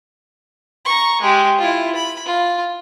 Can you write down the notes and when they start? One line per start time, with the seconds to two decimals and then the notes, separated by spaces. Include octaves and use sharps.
0.85 A#5 C#6
1.21 G#3 G4
1.58 E4 F4
1.95 B5
2.26 F4